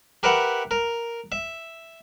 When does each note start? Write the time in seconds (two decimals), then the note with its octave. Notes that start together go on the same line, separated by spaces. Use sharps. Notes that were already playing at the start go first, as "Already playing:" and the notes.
0.23 G4 A#4 B4 E5 F#5
0.71 A#4
1.32 E5